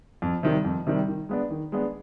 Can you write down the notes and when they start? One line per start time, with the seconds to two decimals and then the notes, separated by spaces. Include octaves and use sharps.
0.22 F2
0.43 C3 D#3 G3
0.64 F2
0.87 C3 D#3 G3
1.08 D#3
1.29 G#3 B3 D4
1.50 D#3
1.72 G#3 B3 D4